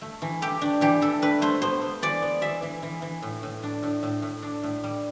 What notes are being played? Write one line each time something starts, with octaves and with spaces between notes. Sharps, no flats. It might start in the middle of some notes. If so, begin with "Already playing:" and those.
A3
E3
A3 G4
D4
E3 G4
D4 A4
A3 B4
A3 C5
B3 C5
B3
E3 D5
B3
E3 E5
E3
E3
E3
A2
A2
D4
A2
A2
A2
D4
A2
G3